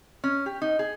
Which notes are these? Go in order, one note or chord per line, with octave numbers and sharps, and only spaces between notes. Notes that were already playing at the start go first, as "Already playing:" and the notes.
C#4
G4
D#4
G#4